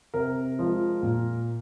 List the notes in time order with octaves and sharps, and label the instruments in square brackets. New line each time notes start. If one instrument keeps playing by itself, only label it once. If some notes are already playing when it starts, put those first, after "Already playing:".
[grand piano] C3 A#4
F3 G#3
A#2